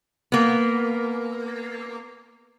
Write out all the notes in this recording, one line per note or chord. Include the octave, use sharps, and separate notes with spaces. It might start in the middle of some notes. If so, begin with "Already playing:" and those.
A#3 B3